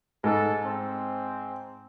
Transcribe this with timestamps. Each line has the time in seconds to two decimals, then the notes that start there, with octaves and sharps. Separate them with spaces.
0.24 G#2 A4
0.65 C4